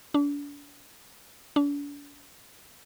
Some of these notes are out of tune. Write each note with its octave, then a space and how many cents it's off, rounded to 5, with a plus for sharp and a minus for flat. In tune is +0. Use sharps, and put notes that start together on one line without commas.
D4 -35
D4 -40